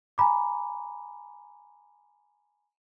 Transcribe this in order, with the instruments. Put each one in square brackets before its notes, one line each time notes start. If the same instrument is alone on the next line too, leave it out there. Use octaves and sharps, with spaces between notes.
[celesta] G#5 A#5 B5 D6